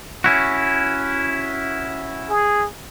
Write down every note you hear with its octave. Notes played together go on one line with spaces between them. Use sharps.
C#4 E4 F#4
G#4